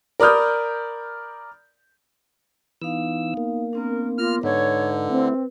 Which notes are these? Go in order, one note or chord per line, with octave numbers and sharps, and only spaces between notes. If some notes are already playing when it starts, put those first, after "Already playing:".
A#4 D5 B5 D#6 F6 G6
E3 B3 D#4 F5 E6
A#3
B3 C4 D4 A#4
B3 F4 A#4 D6 F6
G#2 D3 D#4 B4 C#5
A3 C4 E4